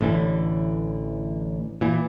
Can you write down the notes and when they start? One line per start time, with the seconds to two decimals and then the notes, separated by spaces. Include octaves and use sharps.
0.01 A1 A2 D3 E3
1.81 A#2 E3